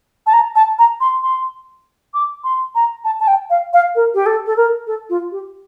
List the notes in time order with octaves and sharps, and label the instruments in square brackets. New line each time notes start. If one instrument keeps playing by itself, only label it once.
[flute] A5
A#5
A5
A#5
C6
C6
D6
C6
A#5
A5
A5
G5
F5
F5
A#4
G4
A4
A4
A#4
A4
F4
G4